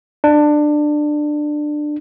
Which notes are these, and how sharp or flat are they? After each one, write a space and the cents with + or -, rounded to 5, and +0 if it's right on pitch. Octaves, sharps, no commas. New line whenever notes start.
D4 +20